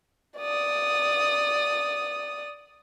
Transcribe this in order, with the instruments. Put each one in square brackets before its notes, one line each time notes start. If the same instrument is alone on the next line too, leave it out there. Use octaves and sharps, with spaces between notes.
[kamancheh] D5 D#6